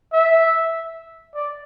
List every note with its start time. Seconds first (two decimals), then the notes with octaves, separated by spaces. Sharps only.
0.13 E5
1.35 D5